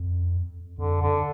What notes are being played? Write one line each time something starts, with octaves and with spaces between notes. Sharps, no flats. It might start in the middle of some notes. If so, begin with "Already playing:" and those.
Already playing: F2
F2 D3
F2 D3